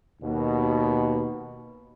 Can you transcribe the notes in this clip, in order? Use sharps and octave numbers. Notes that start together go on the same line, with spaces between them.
D#2 B2